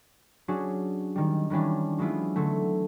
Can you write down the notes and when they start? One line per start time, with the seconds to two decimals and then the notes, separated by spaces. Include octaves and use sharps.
0.48 F#3 C#4 D4 F#4 G#4
1.16 D#3 G3
1.50 D#3 E3 G3 C#4 D4
1.98 F#3 G#3 B3 E4 F4
2.36 D3 F#3 A3